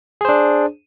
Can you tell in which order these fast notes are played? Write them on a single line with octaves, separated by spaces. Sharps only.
G#4 C5 D4